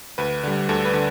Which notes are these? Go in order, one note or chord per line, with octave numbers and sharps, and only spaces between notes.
D2 B4
D3 G3
D2 A4
B4
D3